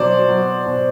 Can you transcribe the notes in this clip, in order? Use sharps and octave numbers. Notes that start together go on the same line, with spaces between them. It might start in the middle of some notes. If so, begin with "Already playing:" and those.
Already playing: B2 F#3 C5 D5
F#3
B2